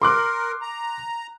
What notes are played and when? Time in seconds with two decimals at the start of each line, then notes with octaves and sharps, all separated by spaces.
0.02 A#4 C6 D6 F#6
0.62 A#5